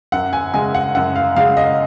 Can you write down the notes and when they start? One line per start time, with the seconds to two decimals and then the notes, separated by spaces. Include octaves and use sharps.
0.12 F#2 F#5
0.33 G#5
0.54 C#3 G#3 G#5
0.75 F#5
0.95 F#2 F#5
1.16 F5
1.36 C#3 G#3 F5
1.57 D#5